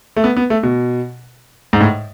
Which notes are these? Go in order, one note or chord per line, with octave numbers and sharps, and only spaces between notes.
A3
B3
B3
A3
B2
G#2
A2